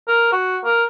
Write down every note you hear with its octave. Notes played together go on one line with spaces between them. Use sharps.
A#4
F#4
A#4